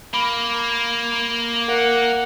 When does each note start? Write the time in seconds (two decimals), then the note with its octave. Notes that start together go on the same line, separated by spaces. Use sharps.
0.14 A#3 B5
1.68 A#4 F5 F#5